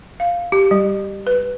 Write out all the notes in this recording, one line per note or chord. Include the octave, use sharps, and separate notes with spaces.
F5
G4
G3
B4